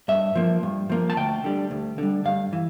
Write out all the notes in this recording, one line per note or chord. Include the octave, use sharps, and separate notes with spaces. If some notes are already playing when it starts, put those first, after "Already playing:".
G2 E5
F3 A#3
G2
F3 A#3
A5
D2 G5
D3 G3
D2
D3 G3
G2 F5
E3